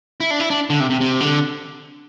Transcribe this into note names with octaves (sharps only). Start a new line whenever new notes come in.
E4
D4
E4
D4
D3
C3
C3
C3
D3